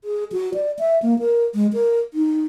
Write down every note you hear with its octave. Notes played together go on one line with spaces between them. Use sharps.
G#4
F#4
D5
E5
A#3
A#4
G#3
A#4
D#4